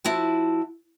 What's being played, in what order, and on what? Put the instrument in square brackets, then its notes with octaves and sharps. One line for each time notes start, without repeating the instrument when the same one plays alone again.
[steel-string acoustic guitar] F3 E4 F#4 A5